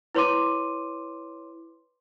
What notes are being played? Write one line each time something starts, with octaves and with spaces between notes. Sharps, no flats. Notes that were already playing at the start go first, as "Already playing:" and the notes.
E4 B4 C#5 C6 D6 D#7